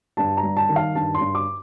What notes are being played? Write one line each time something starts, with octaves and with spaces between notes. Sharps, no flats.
G2 A5
A#5
G3
A5
D#3
F5
G2 A5
C6
G2
D6